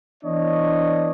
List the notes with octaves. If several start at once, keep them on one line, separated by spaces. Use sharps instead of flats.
E3 B3 D4 C#5 D#5